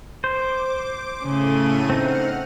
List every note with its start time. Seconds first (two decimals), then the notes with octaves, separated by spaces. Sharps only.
0.24 C5 D6
1.23 A2 C#3 A3 D#7
1.90 C4 D#4 F#5 F6